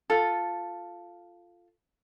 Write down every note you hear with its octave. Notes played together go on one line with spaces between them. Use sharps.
F4 A4